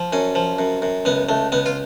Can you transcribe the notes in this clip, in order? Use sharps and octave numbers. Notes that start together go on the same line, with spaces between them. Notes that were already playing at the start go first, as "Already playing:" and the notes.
Already playing: F3
F#2 C#4
F3
F#2
F#2
C#2 B3
C#2 A3
C#2 B3
F4